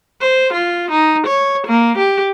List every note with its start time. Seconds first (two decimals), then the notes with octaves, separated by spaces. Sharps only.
0.21 C5
0.53 F4
0.91 D#4
1.27 C#5
1.67 A#3
1.98 G4